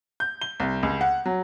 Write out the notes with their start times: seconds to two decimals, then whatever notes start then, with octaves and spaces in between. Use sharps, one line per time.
0.20 G6
0.41 G7
0.60 C2
0.83 C#2
1.01 F#5
1.26 F#3